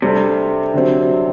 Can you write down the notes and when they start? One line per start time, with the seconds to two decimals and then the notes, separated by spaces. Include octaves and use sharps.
0.02 C3 G3 D4 A4
0.74 D3 F#3 C4